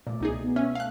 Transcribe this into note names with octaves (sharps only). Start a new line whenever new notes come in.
A#2 A3 D5
C#2 B2 D#4 G#4
B3
C#4 E5
A3 F5 F#6